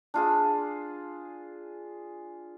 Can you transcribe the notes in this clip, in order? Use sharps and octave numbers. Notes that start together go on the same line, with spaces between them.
D4 F4 G#4